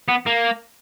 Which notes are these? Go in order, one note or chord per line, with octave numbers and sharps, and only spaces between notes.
B3
A#3